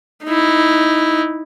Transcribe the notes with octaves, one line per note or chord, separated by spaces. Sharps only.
D#4 E4